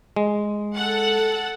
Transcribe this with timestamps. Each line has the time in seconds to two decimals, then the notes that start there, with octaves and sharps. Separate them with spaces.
0.16 G#3
0.75 A4 F#5